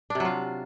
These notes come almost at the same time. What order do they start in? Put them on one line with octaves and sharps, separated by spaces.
D4 C3 F#3 F4